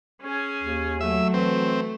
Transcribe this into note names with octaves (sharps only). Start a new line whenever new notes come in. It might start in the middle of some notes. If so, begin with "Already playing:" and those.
C#4 G#4
D#2
F#3 A3 E5
E3 C4